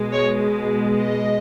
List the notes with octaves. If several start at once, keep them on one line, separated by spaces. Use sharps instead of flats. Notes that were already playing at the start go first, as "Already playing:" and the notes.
Already playing: B2 G#3
C#5
D#5